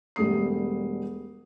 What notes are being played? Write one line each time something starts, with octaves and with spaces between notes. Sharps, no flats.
E1 G3 A3 D#6 C7